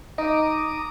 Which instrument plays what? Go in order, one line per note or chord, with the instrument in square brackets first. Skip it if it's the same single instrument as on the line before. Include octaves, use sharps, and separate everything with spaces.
[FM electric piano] D#4 [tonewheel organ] A#5 D6 D#6